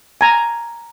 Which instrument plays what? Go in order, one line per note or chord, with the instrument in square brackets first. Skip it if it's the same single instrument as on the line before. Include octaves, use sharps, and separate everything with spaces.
[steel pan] G#5 A#5